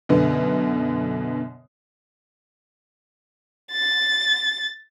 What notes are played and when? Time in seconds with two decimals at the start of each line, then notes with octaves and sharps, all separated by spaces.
0.09 F#2 B2 D3 B3
3.72 A6